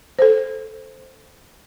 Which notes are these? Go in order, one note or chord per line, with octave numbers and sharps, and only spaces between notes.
A4 C5